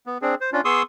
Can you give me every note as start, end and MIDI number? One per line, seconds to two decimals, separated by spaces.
0.06 0.18 59
0.22 0.35 60
0.22 0.35 62
0.22 0.35 68
0.41 0.50 72
0.53 0.61 61
0.53 0.61 62
0.53 0.61 65
0.65 0.83 59
0.65 0.83 68
0.65 0.83 84
0.65 0.83 85
0.65 0.83 87
0.65 0.83 88